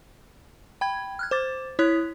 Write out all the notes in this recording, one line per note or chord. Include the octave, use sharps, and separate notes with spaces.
G5 B5 G#6
F6 F#6 G#6
C5 D6 A6
E4 C#5 D#6 F#6 B6